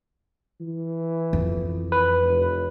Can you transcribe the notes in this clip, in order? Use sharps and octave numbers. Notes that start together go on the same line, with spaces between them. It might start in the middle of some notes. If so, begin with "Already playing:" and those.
E3
F2
B4
F1